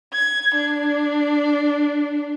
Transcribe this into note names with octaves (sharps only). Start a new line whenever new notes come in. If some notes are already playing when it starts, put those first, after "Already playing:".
G#6
D4